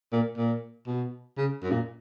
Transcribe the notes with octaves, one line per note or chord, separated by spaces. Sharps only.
A#2
A#2
B2
C#3
F#2
A#2